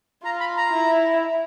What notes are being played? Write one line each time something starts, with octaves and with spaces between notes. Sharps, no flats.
F4 A#5
B5
A#5
E4